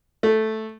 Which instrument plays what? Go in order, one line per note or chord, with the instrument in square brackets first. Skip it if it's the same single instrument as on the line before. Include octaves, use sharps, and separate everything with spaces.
[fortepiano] A3